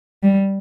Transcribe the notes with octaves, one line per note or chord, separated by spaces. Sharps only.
G3